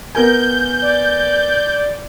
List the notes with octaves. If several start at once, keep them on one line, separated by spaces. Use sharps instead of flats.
B3 A#4 G#5 G6
D5